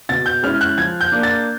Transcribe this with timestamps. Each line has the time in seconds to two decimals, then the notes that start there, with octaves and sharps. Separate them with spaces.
0.09 B2 A6
0.26 G6
0.43 G#3 C#4 E4 F6
0.61 F#6
0.77 F3 G#6
1.01 G6
1.12 A#3 D4
1.23 A6